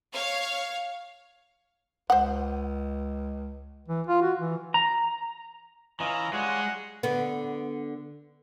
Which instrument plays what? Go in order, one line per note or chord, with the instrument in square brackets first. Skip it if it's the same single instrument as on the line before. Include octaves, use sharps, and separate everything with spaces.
[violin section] C#5 F5
[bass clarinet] C#2 [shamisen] C5 F#5
[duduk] E3
F4
F#4
E3
[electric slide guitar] A#5
[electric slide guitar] E3 [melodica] C#4 F4 D#5 [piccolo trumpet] A#5
[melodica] G3 F4 C#5 [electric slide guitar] G#3 [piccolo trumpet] F#5
[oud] D3 B3